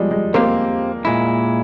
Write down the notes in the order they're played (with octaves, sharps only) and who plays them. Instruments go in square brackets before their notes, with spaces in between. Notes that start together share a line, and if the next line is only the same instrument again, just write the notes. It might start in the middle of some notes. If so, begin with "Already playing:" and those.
Already playing: [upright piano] F3 G3 G#3
G#3
[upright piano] A#3 [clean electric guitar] C4 G4 C5 F5
[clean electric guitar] A#2 G#3 E4